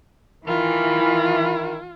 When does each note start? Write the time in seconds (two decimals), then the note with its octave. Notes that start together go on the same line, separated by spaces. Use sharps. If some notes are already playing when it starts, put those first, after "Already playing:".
0.47 D#3 E3 F4 E5 B5